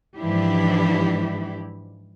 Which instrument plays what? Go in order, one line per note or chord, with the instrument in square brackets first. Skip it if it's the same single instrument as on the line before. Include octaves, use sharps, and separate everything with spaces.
[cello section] G#2 E3 F3 D4 E4 G4